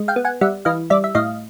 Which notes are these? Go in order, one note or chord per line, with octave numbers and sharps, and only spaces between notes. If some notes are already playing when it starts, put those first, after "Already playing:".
Already playing: G#3
F5 G5
B3
F#5 G#5
G3 E5 F#5
E3 D#5 F5
G3 D5 E5
E5
A2 D#5 F5